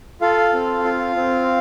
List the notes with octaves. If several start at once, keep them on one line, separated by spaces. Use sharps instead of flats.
F4 A4 F5
C4
F4
C4